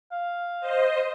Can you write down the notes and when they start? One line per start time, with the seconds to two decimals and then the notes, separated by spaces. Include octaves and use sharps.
0.12 F5
0.61 C5 D#5